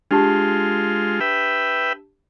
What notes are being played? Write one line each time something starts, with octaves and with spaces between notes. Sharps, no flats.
G#3 D4 F4 G4 A5
B4 E5 G5